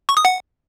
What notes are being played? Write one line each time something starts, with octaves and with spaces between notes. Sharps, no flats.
C#6
D#6
F#5